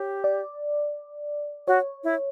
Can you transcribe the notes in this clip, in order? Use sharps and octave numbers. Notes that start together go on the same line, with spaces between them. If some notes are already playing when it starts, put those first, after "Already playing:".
Already playing: G4 C#5
D5
F#4 C#5
E4